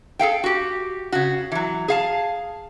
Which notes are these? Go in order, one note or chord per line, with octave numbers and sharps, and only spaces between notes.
G#4 A4 F5 G5
F#4 G4
C#3 F#4
E3 F#3
G#4 F5 A5